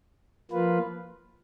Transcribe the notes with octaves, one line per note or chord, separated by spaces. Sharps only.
F3 A#3 F4 B4